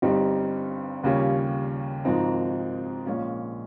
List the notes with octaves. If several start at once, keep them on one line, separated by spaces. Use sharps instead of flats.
G1 G2 G3 C4 D#4
D#2 C#3 G3 C#4 F4
G#1 G#2 F3 C4 D#4
A#1 A#2 G#3 C#4 F4